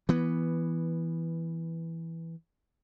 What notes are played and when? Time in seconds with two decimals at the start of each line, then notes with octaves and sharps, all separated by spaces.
0.09 E3 B3